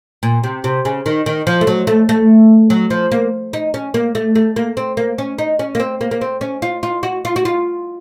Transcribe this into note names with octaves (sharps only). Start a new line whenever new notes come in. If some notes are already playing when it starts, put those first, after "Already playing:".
A#2
C3
C3
C#3
D#3
D#3
F3
A3
F#3
A3
A3
F#3
F3
A#3
D#4
C#4
A#3
A3
A3
A#3
C4
A#3
C#4
D#4
C#4
A#3
C4
A#3
A#3
C4
C#4
F4
F4
F#4
F4
F#4
F4